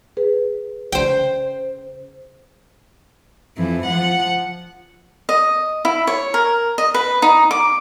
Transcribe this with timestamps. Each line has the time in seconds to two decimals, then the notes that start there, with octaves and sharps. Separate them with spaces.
0.17 G#4 B4
0.92 C#3 C#4 C5 G5
3.57 F2 E3
3.86 F3 F#5
5.29 D#5
5.85 E4
6.07 C#5
6.34 A#4
6.78 D#5
6.94 B4
7.22 D#4
7.51 D6